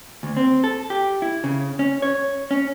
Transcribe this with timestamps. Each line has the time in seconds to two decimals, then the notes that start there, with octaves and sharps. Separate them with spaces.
0.23 D2
0.37 C4
0.64 A4
0.90 G4
1.22 E4
1.44 C#3
1.79 C#4
2.02 C#5
2.51 C#4